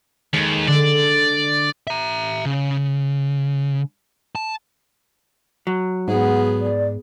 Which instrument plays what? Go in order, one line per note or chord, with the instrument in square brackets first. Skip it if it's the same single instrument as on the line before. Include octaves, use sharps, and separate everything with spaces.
[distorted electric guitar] D#2 [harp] G#3
[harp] D3 [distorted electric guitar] D5
[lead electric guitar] E5 A#5
C#3
A5
[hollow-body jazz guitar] F#3
[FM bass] G#2 [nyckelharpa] B3 G#4 [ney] F#5
[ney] D5